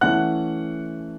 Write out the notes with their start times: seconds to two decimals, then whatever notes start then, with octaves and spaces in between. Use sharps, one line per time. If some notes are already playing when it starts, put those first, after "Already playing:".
0.01 E3 A3 C#4 F#5 F#6